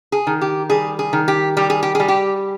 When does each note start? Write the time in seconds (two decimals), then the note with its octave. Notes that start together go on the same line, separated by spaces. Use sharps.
0.12 G#4
0.27 D#3
0.41 G4
0.70 G3 G#4
0.99 G#4
1.13 D#3
1.28 G4
1.57 G3 G4
1.70 G#4
1.83 G4
1.95 G3 G#4
2.08 G4